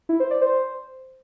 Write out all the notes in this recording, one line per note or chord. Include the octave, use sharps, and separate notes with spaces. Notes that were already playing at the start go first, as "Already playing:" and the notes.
E4
C5
D5
C5